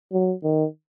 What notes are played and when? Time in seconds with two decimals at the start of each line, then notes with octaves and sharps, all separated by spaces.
0.13 F#3
0.44 D#3